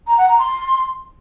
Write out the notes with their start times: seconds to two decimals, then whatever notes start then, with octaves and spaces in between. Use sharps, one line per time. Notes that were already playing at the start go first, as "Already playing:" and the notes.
0.07 A#5
0.18 F#5
0.28 A#5
0.39 C6